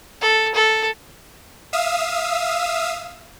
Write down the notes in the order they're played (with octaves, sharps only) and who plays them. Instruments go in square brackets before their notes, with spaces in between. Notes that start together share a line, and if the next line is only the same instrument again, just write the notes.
[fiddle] A4
A4
[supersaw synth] E5 F5 D#6 E6